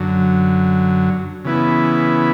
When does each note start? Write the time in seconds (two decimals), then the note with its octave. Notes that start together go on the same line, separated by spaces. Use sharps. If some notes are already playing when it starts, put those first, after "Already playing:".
Already playing: F#2 D3 F#3
1.45 C#3 E3 B3 E4